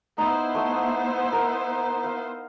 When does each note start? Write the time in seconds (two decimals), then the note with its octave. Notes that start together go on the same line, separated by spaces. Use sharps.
0.18 B3 D#4 E4 C5
0.55 A3
1.32 A#4
2.04 F5